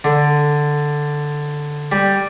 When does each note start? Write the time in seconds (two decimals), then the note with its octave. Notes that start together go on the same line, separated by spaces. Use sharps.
0.04 D3
1.92 G3